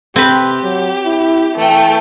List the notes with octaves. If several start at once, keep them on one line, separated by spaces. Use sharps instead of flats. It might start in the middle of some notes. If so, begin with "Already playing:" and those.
C3 C4 G4 B4
F#3
E4
E3 A3 G5